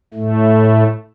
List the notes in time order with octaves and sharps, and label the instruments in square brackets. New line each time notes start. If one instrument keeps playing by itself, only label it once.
[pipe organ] A2 A3